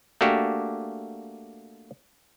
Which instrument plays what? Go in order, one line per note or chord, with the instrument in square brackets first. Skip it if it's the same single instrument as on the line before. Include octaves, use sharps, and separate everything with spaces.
[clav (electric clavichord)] A3 A#3 D4 F#4 G4